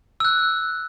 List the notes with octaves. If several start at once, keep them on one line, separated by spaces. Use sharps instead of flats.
E6 F#6